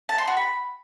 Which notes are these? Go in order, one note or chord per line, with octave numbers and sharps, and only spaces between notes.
A5
C6
F#4
B5